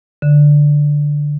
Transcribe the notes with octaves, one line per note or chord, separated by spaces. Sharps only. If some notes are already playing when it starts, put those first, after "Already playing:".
D3